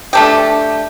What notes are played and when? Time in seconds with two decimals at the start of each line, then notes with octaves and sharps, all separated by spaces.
0.13 A3 D4 G4